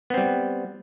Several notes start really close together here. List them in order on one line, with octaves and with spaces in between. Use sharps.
B3 C4 G3